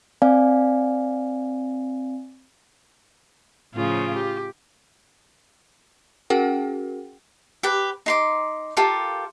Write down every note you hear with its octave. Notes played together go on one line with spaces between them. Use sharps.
C4 D5 F5 G#5
A2 C#3 F3 F4
G4
C#4 F#4 G#4 A#4 F#5 G5
G4 B4
D#4 C6 D6
F4 G4 A4 A#4